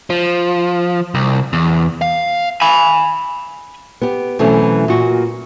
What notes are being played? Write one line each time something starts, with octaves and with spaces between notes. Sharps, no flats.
F3
C2
E2
F5
G#5 B5
B3 G4
B2 E3 F#3 A3 C4 C#4
A#2 F#4